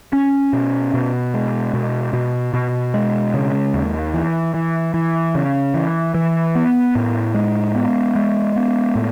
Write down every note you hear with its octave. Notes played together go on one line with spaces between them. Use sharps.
C#4
B2
B2
G#3
B2
B2
B2
G#3
C#3
D#2
E3
E3
E3
C#3
E3
E3
B3
A2
G#3
B3
G#3
B3
A2